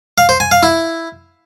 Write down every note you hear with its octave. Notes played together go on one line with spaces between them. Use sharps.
F5
C5
G#5
F5
E4